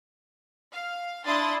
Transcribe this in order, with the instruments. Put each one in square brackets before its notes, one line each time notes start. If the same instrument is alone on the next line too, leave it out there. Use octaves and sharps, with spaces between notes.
[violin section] F5
D4 E4 C6 D#6 A6